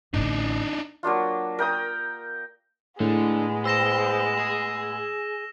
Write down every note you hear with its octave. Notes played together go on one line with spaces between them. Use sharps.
A1 D3 D4 D#4
F#3 A#3 D4 F4
A#4 G5 D#6
A2 D3 G#3 B3
C5 E6 A#6 E7
G#4